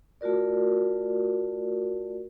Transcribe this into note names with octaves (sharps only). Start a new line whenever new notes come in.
A3 F4 F#4 A#4 D5